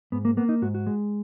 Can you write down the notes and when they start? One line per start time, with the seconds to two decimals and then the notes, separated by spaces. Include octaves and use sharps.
0.12 G#2 B3
0.25 A#3
0.37 A#3 B3
0.49 D#4
0.62 G#2 F#4
0.75 F#4
0.87 G#3